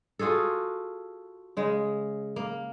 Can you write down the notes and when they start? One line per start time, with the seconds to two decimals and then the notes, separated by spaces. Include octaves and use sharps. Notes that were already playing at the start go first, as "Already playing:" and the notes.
0.19 F4 F#4 G#4 A4
1.57 C#3 G#3
2.36 A#3